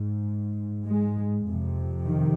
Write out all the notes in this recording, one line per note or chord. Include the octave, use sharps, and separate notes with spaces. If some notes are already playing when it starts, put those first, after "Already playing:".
Already playing: G#2
G#3
F2 C3
D#3